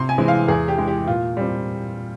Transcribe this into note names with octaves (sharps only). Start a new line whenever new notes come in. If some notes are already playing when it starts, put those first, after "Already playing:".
Already playing: C3 C6
G#5
E3 G#3 C4
F5
E2 G#4
G4
E3 G#3
G4
A#2 F4
G3 C4